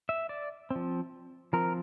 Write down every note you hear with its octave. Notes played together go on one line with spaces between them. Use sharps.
E5
D5
F3 C4
F3 C4 A#4